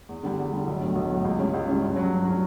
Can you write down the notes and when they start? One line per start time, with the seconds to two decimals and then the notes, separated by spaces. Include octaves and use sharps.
0.09 E2
0.23 D3 G3
0.38 E2
0.53 D3 G3
0.67 B1
0.81 A2 F#3
0.95 B1
1.10 A2 F#3
1.25 C#2
1.39 C#3 G3 C#4
1.54 C#2
1.68 C#3 G3 C#4
1.82 G2
1.96 F#3 C#4
2.11 G2
2.25 F#3 C#4